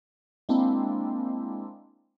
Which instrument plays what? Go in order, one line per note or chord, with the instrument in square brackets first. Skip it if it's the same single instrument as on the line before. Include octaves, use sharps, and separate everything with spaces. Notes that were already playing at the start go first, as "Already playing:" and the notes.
[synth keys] G#3 A#3 C4 D4 E4